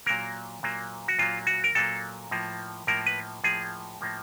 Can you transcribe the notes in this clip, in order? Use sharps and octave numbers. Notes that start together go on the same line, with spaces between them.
A#2 F#3 A#3 A#4
A#2 F#3 A#3
F#4
A#2 F#3 A#3 F4
F#4
A#4
A#2 F#3 A#3 A4
A2 F3 A#3
A2 F3 A#3 A#4
B4
A2 F3 A#3 G#4
A2 F3 A#3